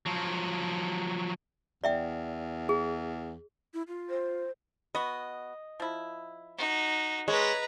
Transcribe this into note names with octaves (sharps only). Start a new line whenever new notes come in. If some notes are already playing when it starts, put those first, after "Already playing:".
F3 F#3
E2 D5 E5 G5
G#4
E4
F4
C5
B3 F#4 D#5
F3 E4
D#4 F#4
G#3 B4 C#5 A#5